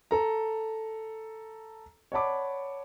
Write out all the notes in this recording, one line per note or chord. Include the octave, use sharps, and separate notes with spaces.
A4 A#5
C#5 D5 F#5 A5 B5 D6